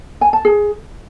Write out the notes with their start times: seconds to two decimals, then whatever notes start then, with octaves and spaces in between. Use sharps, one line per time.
0.21 G#5
0.33 A5
0.45 G#4